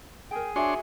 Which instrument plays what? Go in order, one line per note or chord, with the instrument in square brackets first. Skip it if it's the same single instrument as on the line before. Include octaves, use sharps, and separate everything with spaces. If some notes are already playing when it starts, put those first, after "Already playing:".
[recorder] G#4 [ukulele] A#4 G5
[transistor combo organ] D4 C#5 C6 [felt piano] F#4 E5 [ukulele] G#5